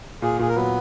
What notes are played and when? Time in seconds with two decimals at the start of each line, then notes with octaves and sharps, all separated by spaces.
0.22 A#2 G#4
0.39 A#2 G#4
0.48 A#4
0.55 F#3 B3 B4